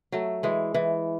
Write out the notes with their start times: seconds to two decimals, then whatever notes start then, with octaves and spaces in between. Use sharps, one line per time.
0.12 F#3 A3
0.43 E3 G#3
0.74 E3